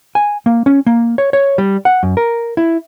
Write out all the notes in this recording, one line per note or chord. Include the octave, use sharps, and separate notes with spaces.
G#5
A#3
C#4
A#3
C#5
C#5
G3
F#5
F#2
A#4
E4